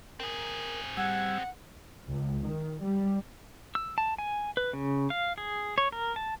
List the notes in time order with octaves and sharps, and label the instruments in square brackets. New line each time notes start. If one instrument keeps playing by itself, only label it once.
[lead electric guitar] C4 G#4 [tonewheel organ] A#4
[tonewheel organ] G3 E6 G#6 [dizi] F#5
[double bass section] C#2
D#3
G3
[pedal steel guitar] E6
A5
G#5
B4
C#3
F5
G#4
C#5
A#4
A5